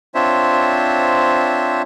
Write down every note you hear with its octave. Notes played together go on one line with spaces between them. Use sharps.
C4 D4 F4 C5 C#5 E5